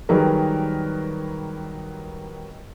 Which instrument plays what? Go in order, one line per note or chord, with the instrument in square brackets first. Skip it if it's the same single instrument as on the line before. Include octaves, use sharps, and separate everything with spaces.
[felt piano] D#3 F#3 G3 G#4 A#4 B4